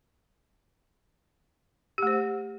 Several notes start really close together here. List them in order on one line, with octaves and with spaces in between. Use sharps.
G4 A3 C5